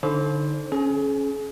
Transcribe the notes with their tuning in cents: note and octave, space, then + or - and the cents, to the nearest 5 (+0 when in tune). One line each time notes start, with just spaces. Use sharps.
D3 +0 D#4 +0 C5 +20
C#4 -5 G#4 +35